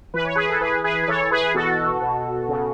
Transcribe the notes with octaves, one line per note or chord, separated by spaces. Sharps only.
E3 B4
C#5
G#4 B4
A4
E3 G#4 B4
G#4 B4
B4
E3 A4 C#5
G#4 B4
B2 F#4 A4
B2
C#3